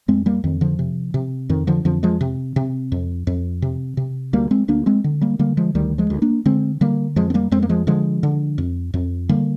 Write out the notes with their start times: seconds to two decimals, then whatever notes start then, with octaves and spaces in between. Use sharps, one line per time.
0.08 F2 G#3 C4
0.26 G3 A#3
0.44 F2 D#3
0.61 D3 F3
0.79 C3
1.14 C3
1.49 F2 D#3
1.67 D3 F3
1.85 F2 D3 F3
2.03 F3 G#3
2.21 C3
2.56 C3
2.92 F2
3.27 F2
3.62 C3
3.97 C3
4.33 D2 G3 A#3
4.51 G#3 C4
4.68 D2 A#3 D4
4.86 G#3 C4
5.04 D3
5.21 G3 A#3
5.39 D3 G3 A#3
5.57 F3 G#3
5.75 D2 D#3 G3
5.98 F3 G#3
6.10 D2
6.22 A#3 D4
6.46 D3 G#3 C4
6.81 D3 G3 A#3
7.16 F2 F3 G#3
7.30 C4
7.34 G3 A#3
7.51 F2 G#3 C4
7.62 A#3
7.69 F3 G#3
7.87 D3 F3 G#3
8.23 D3
8.58 F2
8.94 F2
9.29 D3 G3 A#3